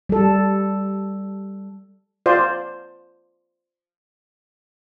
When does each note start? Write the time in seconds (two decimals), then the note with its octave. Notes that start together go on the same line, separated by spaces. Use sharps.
0.09 G3 A4
2.26 F4 C5 D5